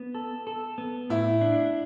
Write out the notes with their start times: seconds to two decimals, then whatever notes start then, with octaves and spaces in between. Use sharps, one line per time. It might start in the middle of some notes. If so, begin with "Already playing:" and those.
Already playing: B3
0.15 A4
0.47 A4
0.78 B3
1.10 A2 E4
1.41 D4